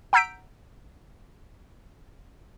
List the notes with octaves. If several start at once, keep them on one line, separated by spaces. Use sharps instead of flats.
F#5 A#5 E6 G6 B6 D7